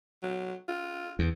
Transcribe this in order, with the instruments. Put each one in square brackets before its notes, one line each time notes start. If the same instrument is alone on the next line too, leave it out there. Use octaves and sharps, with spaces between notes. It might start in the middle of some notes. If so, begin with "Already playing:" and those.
[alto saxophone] F#3
F4
[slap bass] E2